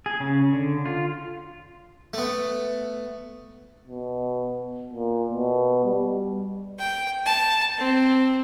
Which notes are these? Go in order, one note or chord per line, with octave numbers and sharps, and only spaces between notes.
G#4
C#3
D3
F4
A3 B3
B2
A#2
B2
G3
G5
A5
C4